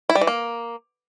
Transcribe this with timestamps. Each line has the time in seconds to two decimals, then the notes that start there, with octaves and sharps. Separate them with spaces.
0.09 E4
0.15 G3
0.21 E3
0.27 A#3